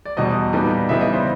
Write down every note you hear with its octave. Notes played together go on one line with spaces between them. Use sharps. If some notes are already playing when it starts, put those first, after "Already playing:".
D5
E2 B2 G3 D#5
A#2 G3 B3 D#4
C#3 E3 G3 B3 D#4 E5
D#5
C5